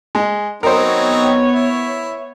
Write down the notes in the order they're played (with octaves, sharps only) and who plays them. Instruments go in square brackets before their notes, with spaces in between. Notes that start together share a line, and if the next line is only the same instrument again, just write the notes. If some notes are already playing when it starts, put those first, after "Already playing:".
[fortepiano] G#3
[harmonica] F#3 C4 D#4 [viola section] B3 C#5 [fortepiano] A#4 C5
[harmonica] E4